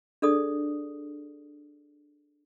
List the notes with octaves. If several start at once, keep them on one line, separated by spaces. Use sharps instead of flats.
D4 G#4 A4 D5 D#6